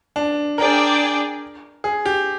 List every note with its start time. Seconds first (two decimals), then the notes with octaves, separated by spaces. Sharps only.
0.16 D4
0.58 D4 G#4 A#4 D5 G5
1.84 G#4
2.06 G4